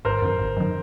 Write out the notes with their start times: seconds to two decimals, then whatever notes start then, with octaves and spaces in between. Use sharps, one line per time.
0.05 G#1 A#4 C5
0.22 F#2 D#3
0.39 G#1
0.57 F#2 D#3